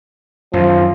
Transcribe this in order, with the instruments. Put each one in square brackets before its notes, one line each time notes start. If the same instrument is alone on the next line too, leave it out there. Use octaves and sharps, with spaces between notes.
[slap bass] F#2 D#3 [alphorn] F3